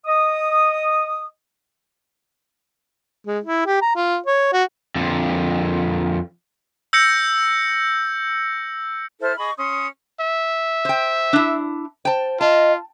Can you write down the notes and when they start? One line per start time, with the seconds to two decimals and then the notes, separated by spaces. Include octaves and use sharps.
0.06 D#5 D#6
3.27 G#3
3.44 E4
3.66 G4
3.82 A#5
3.96 F4
4.26 C#5
4.53 F#4
4.96 F2 D3
6.93 E6 G6 A#6 C#7
9.20 E4 A4 C5 F6
9.37 G#4 D#5 B5 C#6
9.57 C#4 C6 D#6
10.20 E5
10.85 C5 G5
11.33 D4 E4
12.05 C5 G5 A5
12.41 F4 D#5 A5